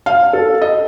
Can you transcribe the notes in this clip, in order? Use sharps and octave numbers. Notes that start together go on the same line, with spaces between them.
F5
A4
D#5